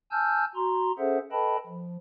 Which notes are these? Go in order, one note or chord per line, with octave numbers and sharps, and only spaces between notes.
G#5 A5 E6 F6 G6
F#4 A#5 C6
C#4 G#4 A4 C5 E5 F#5
A4 B4 D#5 G5 A5 B5
F3